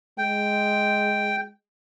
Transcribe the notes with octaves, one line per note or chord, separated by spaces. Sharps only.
G#3 G5